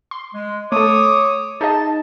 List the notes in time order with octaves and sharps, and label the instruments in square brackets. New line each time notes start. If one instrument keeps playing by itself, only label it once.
[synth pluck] C6
[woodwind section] G#3
[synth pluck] A3 A4 [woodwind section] C#5 D6 D#6
[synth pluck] D#4 G#4 D#5 [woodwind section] A5